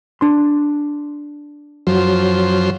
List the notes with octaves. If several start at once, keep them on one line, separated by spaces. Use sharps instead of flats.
D4 C6
F#2 F3 F#3 C5